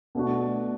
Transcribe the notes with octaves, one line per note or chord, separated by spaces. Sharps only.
B2 A3 D4 F#4